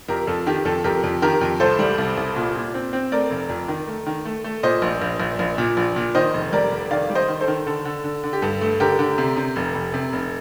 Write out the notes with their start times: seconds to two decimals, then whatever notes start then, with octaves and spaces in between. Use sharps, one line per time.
0.08 F2 G4 A#4
0.27 F2 A4
0.47 D#3 G4
0.65 F2 A4
0.84 F2 G4 A#4
1.03 F2
1.22 D#3 G4 A#4
1.41 F2
1.60 C2 A4 C5
1.79 G3
1.98 C2
2.17 C2
2.36 A#2
2.55 A#2
2.74 C4
2.93 C4
3.12 A3 A#4 D5
3.30 F1
3.49 F2
3.68 D#3
3.87 A3
4.06 D#3
4.25 A3
4.44 A3
4.63 A#2 C5 D#5
4.82 A#1
5.02 A#1
5.20 A#1
5.39 A#1
5.58 A#2
5.77 A#1
5.96 A#2
6.15 D#3 C5 D#5
6.34 F1
6.52 G3 A#4 D5
6.71 F1
6.91 D#3 D5 F5
7.10 G3
7.15 C5 D#5
7.29 D#3
7.41 A4 C5
7.48 D#3
7.67 D3 A4
7.85 D3
8.04 D3
8.24 D3
8.33 G4
8.42 G2 A4
8.61 A3
8.80 D3 G4 A#4
8.99 D3
9.18 C3
9.37 C3
9.56 F1
9.74 F1
9.94 C3
10.13 F1